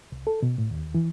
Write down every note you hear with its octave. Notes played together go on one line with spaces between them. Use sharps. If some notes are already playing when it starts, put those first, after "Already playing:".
C2
A4
B2
A2
D#2
E3